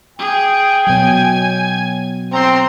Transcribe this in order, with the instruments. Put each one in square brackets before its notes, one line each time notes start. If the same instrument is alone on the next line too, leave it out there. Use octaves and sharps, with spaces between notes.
[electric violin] G#4 [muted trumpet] G5
[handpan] B2 F#3 [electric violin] G#5
[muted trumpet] C4 [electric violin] A#5 C6